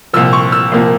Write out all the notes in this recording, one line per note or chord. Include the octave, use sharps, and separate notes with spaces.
C2 A#2 F3 E6
C#6
E6
C2 A#2 F3 A#3